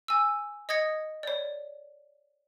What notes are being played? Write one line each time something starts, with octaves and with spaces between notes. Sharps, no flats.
G#5 E6
D#5 D#6 G#6 A#6 C#7
C#5 D5